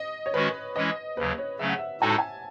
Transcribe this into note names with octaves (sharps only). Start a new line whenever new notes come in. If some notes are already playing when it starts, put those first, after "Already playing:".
Already playing: D#5
C#5
D#3 G#3 C#4 F#4 B4
E3 G#3 C#4 E4 D#5
D#2 C#3 F#3 B4
C#5
C#3 F#3 A3 C#4 E5
F#5
E5
A2 G#3 D#4 F#4 A4 G#5
A5
G#5